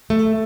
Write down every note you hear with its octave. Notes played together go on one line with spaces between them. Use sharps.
A3